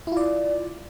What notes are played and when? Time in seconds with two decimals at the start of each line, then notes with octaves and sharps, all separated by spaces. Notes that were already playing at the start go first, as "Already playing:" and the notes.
0.07 E4
0.12 F4
0.17 D5